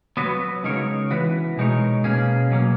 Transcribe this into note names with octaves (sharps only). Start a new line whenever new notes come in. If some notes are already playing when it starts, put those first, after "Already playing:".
F#3 B3 F#4 B4
C#3 G#3 D#4 A#4 C#5
E3 B3 F#4 B4
B2 G#3 D#4 A#4 C#5
B2 A#3 C#4 G#4
B2 F#3 A#3 C#4